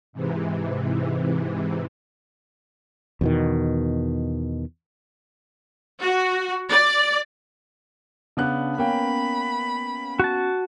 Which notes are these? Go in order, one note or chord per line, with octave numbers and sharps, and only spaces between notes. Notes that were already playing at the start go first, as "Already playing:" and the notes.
G#2 C3 E3
E2 B2 D#3
F#4
D5
C#3 B3 D4 F#6
A#3 B3 C#4 G5 B5
F#4 A5